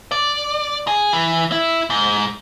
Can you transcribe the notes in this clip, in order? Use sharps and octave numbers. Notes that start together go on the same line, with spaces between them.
D5
G#4
E3
E4
G#2